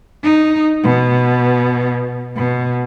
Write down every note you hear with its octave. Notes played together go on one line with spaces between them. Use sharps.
D#4
B2
B2